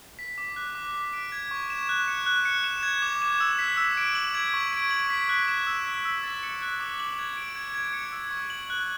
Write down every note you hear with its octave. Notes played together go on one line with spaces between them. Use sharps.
B6
D6
F#6
D6
B6
D7
G#6
C#6
E7
F#6
C#7
F#6
C#7
E7
G#6
D6
E7
E6
B6
E6
D7
F#7
G#6
C#6
D7
F#7
B6
F#6
E7
E6
B6
E6
A6
C#7
F#6
D6
F#7
G#6
D7
G#6
G#6
C#7
E6
C#6
F#7
F#6